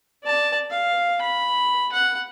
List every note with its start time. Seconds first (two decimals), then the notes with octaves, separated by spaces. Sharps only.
0.23 D5 A5
0.70 F5
1.22 B5
1.92 F#5